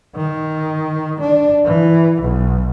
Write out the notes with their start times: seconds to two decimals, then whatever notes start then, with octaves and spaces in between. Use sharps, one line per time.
0.16 D#3
1.20 D4
1.65 E3
2.22 B1